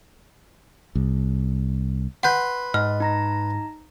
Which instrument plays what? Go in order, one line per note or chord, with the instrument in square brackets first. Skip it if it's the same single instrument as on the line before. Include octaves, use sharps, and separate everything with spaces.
[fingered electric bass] C2
[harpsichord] B4 C6 [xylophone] F#5 G6
[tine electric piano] G#2 [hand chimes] D#5 [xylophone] F6
[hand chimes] D#4 A#5 A#6